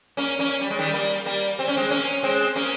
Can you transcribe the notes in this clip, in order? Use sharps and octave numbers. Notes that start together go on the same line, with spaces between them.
A#3 C#4
A#3 C#4
G3
G#3
D#3 G3
G3 A#3
G3 A#3
C4
C#4
G#3 C4
A#3 C#4
G#3 C4
A#3 C#4